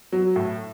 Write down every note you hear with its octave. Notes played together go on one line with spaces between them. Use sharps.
F#3
A2